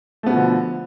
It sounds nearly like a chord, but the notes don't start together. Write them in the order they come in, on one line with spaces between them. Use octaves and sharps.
A3 B3 B2 F3 D3